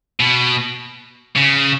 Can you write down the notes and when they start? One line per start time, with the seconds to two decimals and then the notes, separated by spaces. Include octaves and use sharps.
0.20 B2
1.36 C#3